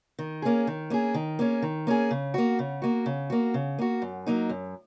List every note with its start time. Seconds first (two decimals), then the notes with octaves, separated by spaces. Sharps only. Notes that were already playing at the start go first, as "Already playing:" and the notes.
0.19 D#3
0.42 A#3 C#4 G#4
0.67 D#3
0.90 A#3 C#4 G#4
1.14 D#3
1.39 A#3 C#4 G#4
1.62 D#3
1.87 A#3 C#4 G#4
2.11 C#3
2.34 A#3 F#4
2.59 C#3
2.82 A#3 F#4
3.06 C#3
3.30 A#3 F#4
3.54 C#3
3.79 A#3 F#4
4.02 F#2
4.26 F#3 A#3 D#4
4.49 F#2